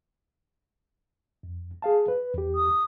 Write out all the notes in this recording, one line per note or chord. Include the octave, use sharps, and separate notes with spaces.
F2
G#4 F5 A5
B4
E2 G4
D#6